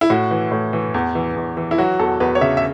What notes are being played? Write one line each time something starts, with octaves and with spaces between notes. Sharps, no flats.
E4
A2 F#4
E3
A2
E3
E2
E3
E2
E3
E4
F#3 F#4
E2 A4
E2 B4
C#5
C#3 E5
E5